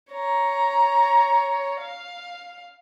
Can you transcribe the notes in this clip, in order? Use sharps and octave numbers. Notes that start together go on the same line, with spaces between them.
C#5 A#5
F5